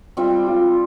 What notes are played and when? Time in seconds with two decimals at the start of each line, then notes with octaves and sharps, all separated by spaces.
0.17 G3 C4 F4
0.48 F4